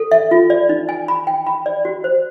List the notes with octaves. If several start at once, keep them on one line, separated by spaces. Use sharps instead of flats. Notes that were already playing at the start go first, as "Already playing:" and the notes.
Already playing: A4
E5
F4
D5
D#4
G#5
B5
G5
B5
D5
F#4
C5